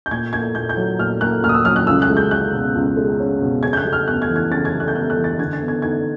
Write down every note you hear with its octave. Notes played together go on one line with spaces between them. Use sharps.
G6
A#2 G#6
A#3 G#6
A#2 G6
G6
F#3
A#2 F6
A#3 F#6
A#2 F6
D#6
E6
F#3 F6
F#6
C#2 E6
F#6
G#3
G6
C#4 F#6
B2
C#2
G#3
C#4
B2
C#3 G#6
G6
F#6
G3
F6
B3 F#6
G#6
E3
G#6
C#3 A6
G#6
G3
F#6
G6
B3 F#6
F#6
E3
A6
D3 G#6
A6
B3
G#6
D#4 G#6